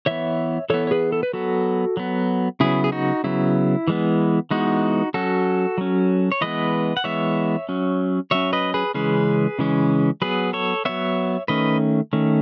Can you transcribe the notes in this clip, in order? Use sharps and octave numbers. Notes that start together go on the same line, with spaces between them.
E3 B3 C#5 E5
E3 B3 A4 C#5
C#5
G#4 B4
A4
B4
F#3 B3 F#4 A4
F#3 B3
C#3 F#3 B3 E4 G#4
G#4
D#4 F#4
C#3 F#3 B3 E4
E3 G#3 B3
E3 G#3 B3 D#4 F#4
F#3 C#4 F#4 A4
F#3 C#4
C#5
E3 G#3 B3 B4 D#5
F#5
E3 G#3 B3 C#5 E5
F#3 C#4
F#3 C#4 C#5 E5
B4 D#5
G#4 B4
C#3 E3 G#3 C#4 G#4 B4
C#3 E3 G#3 C#4
F#3 B3 G#4 B4
A4 C#5
F#3 B3 C#5 E5
D#3 A3 C#4 B4 D#5
D#3 A3 C#4